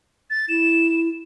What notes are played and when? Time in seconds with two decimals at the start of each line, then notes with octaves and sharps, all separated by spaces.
0.30 A6
0.49 E4 E7